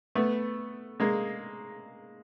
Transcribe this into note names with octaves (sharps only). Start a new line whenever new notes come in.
A3 B3
G#3 A#3